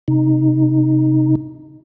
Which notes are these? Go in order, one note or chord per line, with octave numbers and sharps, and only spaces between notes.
C3 D#4